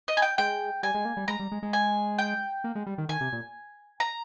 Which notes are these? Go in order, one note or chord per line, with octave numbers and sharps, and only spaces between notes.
D#5
G#5
G5
G#3 G5
G3 G#5
G#3
A#3
G3
G#3 A#5
G3
G#3
G#3
G#5
G5
A#3
G#3
G3
D#3
D#3 G#5
C3
A#2
A#5